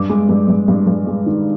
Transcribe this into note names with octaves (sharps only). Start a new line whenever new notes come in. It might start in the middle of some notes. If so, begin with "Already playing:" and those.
Already playing: G2 D6
G#3
G2
G2
G2
G2
G#3
D#3